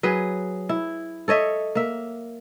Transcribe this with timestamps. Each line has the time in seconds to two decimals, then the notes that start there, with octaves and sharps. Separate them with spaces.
0.03 F#3 G#4 B4
0.69 E4
1.28 A4 C#5 D#5 E5
1.75 A#3 E5